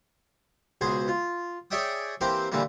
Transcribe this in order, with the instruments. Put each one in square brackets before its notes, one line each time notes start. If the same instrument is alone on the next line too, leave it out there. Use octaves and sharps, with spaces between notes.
[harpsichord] C#2 B2 G#4 C5 G#5
F4
G#4 C#5 D5 E5 G5 D#6
E3 A#3 C4 G4 C5
A#2 D3 E3 G3 A3 A#3